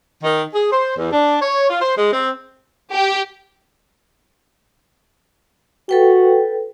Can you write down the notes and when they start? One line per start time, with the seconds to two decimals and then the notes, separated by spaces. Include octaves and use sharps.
0.23 D#3
0.54 G#4
0.71 C5
0.97 E2
1.12 D4
1.41 C#5
1.70 F4
1.82 C5
1.96 G#3
2.12 C4
2.92 G4
5.89 F#4 A4 B4 G5